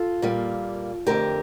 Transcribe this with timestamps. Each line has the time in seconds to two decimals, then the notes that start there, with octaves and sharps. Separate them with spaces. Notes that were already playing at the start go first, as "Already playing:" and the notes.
Already playing: F4 A4
0.22 A#2 G3 A#3
1.07 F2 D3 A3 G4 A#4